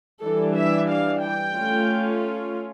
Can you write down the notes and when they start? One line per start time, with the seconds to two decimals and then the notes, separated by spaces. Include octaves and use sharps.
0.24 E3 G3 D4 A4
0.57 E5
0.89 F5
1.22 G5
1.54 A3 C#4 F4